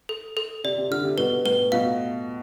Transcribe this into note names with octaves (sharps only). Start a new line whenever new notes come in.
A4
A4
C3 D5
C3
D3 F6
C3
B2 B4
A2 B4
B2 F5